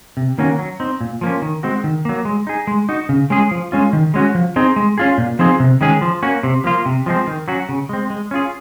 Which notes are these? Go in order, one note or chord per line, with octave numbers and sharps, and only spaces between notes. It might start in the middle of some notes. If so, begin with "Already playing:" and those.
C3
D#3 A#3 C#4 F#4
F#3
C4 D#4
A#2
F3 A#3 C#4
D#3
G#3 C4 F#4
D#3
F#3 A#3
G#3
D#4 G#4
G#3
D#4 F#4
C#3
G#3 C#4 G#4
F3
G#3 C#4 F4
D#3
G#3 C#4 F#4
F3
C4 D#4 G#4
G#3
C#4 F4 G#4
A#2
F3 C4 D#4 G#4
C3
D#3 G#3 C#4 G#4
F3
A#3 C#4 F#4
C3
F3 A#3 F4
C3
F3 G#3 C4
D#3
F#3 C#4 F#4
C#3
G#3 C4
G#3
C#4 F4 G#4